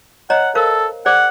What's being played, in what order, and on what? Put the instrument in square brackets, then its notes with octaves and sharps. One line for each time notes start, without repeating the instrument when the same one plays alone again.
[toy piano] C#5 D#5 A#5 [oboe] F#5
[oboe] A4 [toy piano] A#4 C5 F5
[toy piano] G#4 C5 D5 [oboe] F#5